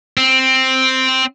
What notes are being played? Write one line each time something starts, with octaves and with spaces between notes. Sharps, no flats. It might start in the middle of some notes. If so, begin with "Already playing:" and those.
C4